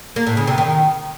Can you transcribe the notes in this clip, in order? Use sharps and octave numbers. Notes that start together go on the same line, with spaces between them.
A#3
A2
C#3
C3
D#3